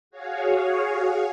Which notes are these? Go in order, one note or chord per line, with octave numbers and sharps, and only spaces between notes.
F#4 G#4 C#5 F5